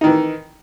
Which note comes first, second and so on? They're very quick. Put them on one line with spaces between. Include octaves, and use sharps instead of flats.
D#4 D#3 E3